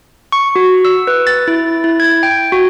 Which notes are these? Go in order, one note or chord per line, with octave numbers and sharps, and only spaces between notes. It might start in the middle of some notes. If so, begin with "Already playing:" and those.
C#6
F#4
E6
B4
A6
E4
E4
G#6
G5
F#4